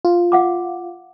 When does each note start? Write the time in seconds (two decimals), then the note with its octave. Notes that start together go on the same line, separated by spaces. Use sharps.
0.05 F4
0.32 F5 F#5 D6